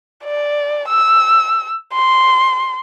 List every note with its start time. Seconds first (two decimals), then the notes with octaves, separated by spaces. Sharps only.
0.25 D5
0.88 E6
1.94 C6